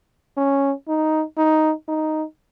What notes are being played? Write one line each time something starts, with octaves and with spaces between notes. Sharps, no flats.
C#4
D#4
D#4
D#4